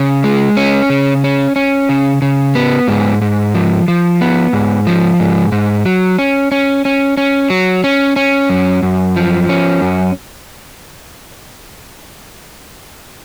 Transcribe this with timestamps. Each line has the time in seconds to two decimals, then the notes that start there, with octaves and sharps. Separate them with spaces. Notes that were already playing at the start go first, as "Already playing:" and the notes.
Already playing: C#3
0.24 G#3
0.57 C#4
0.90 C#3
1.24 C#4
1.56 C#4
1.89 C#3
2.22 C#3
2.55 B3
2.88 G#2
3.22 G#2
3.55 F3
3.88 F3
4.21 B3
4.53 G#2
4.87 F3
5.20 G#2
5.52 G#2
5.86 F#3
6.19 C#4
6.52 C#4
6.85 C#4
7.17 C#4
7.50 F#3
7.84 C#4
8.16 C#4
8.50 F#2
8.83 F#2
9.16 F3
9.49 C#4
9.81 F#2